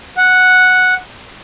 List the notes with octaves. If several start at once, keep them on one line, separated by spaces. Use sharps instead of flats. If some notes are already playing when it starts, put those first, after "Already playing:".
F#5